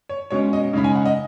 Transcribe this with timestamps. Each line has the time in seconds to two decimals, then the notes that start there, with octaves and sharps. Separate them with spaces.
0.09 C#5
0.30 B2 G#3 C#4 C#5
0.53 D#5
0.73 C#3 G#3 D#4 B5
0.84 G#5
0.95 F#5
1.06 D#5